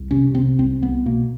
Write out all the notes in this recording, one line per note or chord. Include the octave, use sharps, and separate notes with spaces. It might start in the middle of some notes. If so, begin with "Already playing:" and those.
Already playing: C2
C3 C#4
C3 C4
C2 C4
C2 B3
B2 A#3